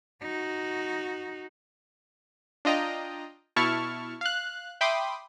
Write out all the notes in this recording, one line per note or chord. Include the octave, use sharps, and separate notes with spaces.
D#4 F#4
D4 F4 D#5 G5 A#5
B2 E4 A5 C#6 F6
F5 F#6
E5 G5 B5 C6 D6 D#6